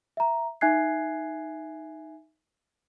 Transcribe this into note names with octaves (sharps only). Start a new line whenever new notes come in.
E5 A#5
D#4 E5 G#5 F#6 G#6 C7